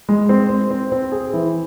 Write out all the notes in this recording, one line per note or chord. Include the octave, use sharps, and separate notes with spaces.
G#3
C4
C4
C4
C4
G#4
E3